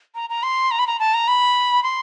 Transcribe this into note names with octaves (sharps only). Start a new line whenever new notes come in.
A#5
A#5
C6
A#5
B5
A#5
A5
A#5
B5
C6